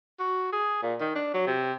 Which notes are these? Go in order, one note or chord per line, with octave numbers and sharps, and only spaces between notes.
F#4
G#4
A#2
D#3
D4
F#3
C3